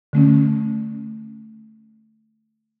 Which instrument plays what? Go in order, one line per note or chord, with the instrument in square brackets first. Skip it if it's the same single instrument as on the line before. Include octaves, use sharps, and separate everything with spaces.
[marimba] D3 A3 C#4